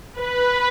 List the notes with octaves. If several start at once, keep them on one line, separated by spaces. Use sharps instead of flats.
B4